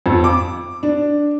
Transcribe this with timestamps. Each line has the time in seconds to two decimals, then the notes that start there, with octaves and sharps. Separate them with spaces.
0.06 F2
0.24 D6
0.83 D4